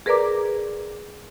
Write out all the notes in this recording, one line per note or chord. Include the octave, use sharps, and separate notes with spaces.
G#4 A#4 B4 D5 A#5 D6